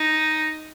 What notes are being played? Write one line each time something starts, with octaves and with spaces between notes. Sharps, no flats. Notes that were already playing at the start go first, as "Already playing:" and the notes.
Already playing: D#4